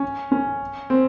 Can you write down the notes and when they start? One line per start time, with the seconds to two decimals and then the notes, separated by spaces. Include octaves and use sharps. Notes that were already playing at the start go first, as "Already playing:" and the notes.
Already playing: C#4
0.32 C#4
0.90 C4